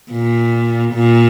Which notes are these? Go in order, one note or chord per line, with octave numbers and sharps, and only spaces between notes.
A#2
A#2